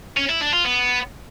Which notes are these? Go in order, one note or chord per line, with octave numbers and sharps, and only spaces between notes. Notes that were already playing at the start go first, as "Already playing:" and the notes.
C#4
E4
D4
F4
B3